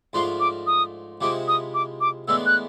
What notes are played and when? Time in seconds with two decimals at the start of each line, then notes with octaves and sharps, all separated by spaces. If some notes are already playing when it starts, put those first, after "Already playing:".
0.13 G#2 F3 A3 D4 F4 C6
0.40 D6
0.67 D#6
1.21 C3 F3 G#3 C4 E4 D6
1.48 D#6
1.74 D6
2.01 D6
2.28 A2 E3 G#3 B3 D4 E6
2.46 F#6